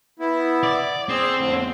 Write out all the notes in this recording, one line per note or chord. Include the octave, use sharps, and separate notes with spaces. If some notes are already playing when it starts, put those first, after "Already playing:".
B3 E4
D5
C4 G#4 E6
F2 A2 D3